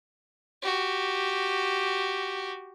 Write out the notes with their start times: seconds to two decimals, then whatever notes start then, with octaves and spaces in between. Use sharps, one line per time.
0.63 F#4 G4